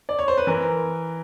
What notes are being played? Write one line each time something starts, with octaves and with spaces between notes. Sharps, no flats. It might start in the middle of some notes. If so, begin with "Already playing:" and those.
D5
C#5
C5
B4
E3 A#4